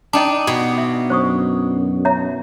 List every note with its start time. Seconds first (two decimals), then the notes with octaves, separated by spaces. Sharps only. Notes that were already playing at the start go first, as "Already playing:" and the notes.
0.13 D4 D#4 D#5 G5 A5
0.47 B2
0.78 E5
1.10 F#2 C5 C#6 D#6
2.05 C#5 E5 A#5